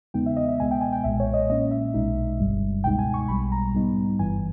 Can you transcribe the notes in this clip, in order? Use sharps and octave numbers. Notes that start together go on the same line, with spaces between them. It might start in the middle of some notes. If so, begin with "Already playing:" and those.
E2 C#3 G#3 B3 D#4 G5
E5
D#5
E5
C#2 B2 G#3 B3 G#5
G5
G#5
G5
B1 A#2 G#3 E5
C#5
D#5
A#2 A#3 C#4 D#5
E5
B1 B2 G#3 D#4
G1 G2 G3
C#2 B2 G#3 D#4 G5
G#5
C#6
B1 B2 G3 B5
A#5
G#2 G3 B3 D#4
G1 G2 E3 G#5